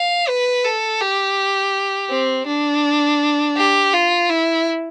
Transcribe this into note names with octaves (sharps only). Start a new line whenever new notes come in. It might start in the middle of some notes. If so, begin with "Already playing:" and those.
Already playing: F5
B4
A4
G4
C4
D4
G4
F4
E4